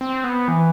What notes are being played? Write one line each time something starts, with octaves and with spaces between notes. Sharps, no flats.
C4
B3
E3